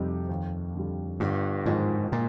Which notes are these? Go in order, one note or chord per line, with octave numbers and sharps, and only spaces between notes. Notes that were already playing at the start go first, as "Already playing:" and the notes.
Already playing: F2 C3 G3 C4 D#4 G4
D#2
D3 G3
G1 G2
F2 G#2 D#3 G#3 D#4
A#2